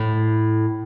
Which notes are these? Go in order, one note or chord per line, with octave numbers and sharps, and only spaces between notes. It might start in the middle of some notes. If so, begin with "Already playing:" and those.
Already playing: A2